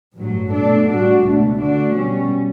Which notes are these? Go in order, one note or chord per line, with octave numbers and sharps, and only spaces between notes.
A1 G2 F#3
B2 A3 D4 A4
A2 G3 D4 F#4
C#2 B2 A3 D4
D3 A3 D4 F#4
B2 G3 C#4